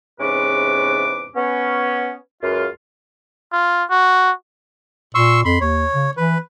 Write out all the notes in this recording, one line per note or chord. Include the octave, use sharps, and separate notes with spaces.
E2 G#2 C3 C#4 B4 D6
B3 C#4
C#2 F#2 F4
F4
F#4
A#2 C6 C#6 E6
F2 B5 C6
D#2 C#5
C#3
E3 B4